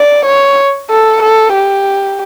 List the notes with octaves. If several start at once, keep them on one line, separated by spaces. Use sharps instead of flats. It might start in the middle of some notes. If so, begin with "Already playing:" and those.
Already playing: D5
C#5
A4
A4
G4